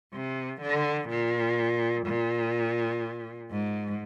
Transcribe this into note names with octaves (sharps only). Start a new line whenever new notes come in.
C3
D3
A#2
A#2
G#2